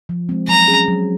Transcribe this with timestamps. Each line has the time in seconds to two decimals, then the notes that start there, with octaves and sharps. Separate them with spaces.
0.09 F3
0.29 G#3 C4
0.48 F#3 A#5
0.68 C#4 G#4
0.88 F#3